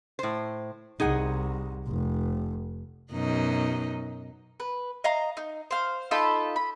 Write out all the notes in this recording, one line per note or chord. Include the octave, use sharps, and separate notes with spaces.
A2 C5
C2 D#4 G#4 F#5
F1
F#2 B2 D#4
B4
D#5 F5 A#5
D#4
C5 F5
D#4 F4 A4 B5
B5